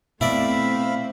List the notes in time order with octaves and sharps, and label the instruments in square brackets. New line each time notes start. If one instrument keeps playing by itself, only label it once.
[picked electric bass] B2 [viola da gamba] A3 C4 [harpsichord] E4 D5 [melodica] E5 F5 B5